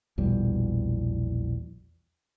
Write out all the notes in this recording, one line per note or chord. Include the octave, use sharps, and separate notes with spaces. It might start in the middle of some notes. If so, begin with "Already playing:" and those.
A#1 E2 B2 G3